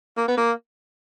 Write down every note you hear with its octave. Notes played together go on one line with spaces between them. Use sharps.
A#3
B3
A#3